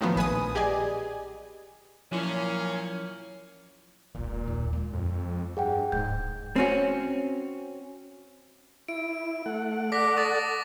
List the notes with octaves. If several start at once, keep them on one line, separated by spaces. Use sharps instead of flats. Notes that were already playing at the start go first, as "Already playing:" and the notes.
A2 D#3 F3 F#3 B3
A#1 B4 G#5 D#6
G4 G#4 D5 D#5 G#5
A#2 F3 F#3 C#4 E4
E1 B1 A#2
D#2
G#3
F2
G2 G#4 F#5 G5
D1 G#2 G6
C4 C#4 F#4
E4 D7
A3 F#5
A4 D5 F#5 D6 A#6 B6
C#6 D#6 A6